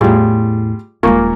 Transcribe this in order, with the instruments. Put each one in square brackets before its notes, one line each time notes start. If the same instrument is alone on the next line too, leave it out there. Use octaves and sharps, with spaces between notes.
[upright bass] E2 A2 [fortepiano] G3 F4 G#4
[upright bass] D#1 G#3 [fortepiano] A#2 A#3 C#6